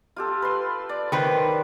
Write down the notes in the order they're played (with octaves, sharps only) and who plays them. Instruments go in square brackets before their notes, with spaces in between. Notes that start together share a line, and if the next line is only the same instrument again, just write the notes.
[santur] F4 G4 A4
B4 C6
D5
[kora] D#3 B4 C5